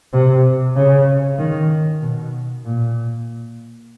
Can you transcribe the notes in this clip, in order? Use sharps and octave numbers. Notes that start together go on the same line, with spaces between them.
C3
C#3
D#3
B2
A#2